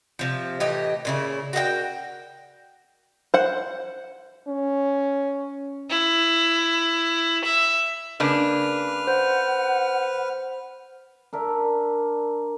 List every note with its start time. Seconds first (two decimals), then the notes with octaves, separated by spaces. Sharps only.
0.19 C3 F3
0.60 A2 E3 G4 D#5
1.05 A#2 C#3 E4
1.53 F#4 A#4 D#5 G5
3.34 C5 F#5
4.48 C#4
5.90 E4
7.44 E5
8.20 C#3 A#3 D4 B4 F6
9.07 C5 F#5
11.33 D4 A#4 E5